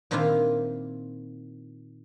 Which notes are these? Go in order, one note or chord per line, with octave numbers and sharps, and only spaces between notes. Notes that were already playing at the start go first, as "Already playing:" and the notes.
A#2 D#3 C4 D4 E4 F4